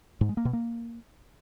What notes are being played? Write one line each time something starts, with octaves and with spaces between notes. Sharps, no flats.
G#2
G#3
A#3
B2
A#3